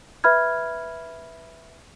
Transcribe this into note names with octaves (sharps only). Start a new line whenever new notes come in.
B4 E5 B5 F6 G#6